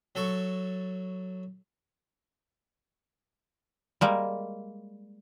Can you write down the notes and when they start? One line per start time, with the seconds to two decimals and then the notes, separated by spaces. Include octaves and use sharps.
0.15 F#3 A4 A5 C#6
4.01 G3 G#3 A#3